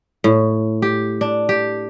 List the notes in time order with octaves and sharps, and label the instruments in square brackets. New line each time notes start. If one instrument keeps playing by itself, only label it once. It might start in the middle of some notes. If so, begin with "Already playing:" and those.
[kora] A2
G4
D4
G4